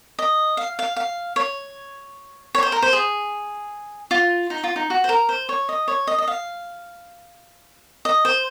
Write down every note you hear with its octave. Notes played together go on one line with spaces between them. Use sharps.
D#5
F5
F5
F5
C#5
C#5
C5
A#4
C5
G#4
F4
D#4
F4
D#4
F#4
C5
A#4
C5
C#5
D#5
C#5
D#5
D#5
F5
D#5
C5